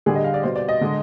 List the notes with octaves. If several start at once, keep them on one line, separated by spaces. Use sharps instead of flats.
D3 G3 G#4
D#5
F5
D5
B2 G3 C5
D5
D#5
D3 G#3